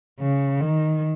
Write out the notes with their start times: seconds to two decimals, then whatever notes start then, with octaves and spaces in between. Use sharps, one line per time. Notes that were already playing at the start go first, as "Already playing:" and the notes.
0.20 C#3
0.60 D#3